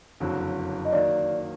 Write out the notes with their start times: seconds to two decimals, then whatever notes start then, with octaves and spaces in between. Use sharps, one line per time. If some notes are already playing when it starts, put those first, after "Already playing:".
0.20 F#1 F2 D3 F#3
0.85 D#5
0.92 D#3 F#3 A#3 D5